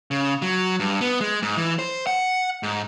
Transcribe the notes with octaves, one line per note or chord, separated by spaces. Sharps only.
C#3
F#3
G2
B3
G#3
G#2
E3
C5
F#5
G#2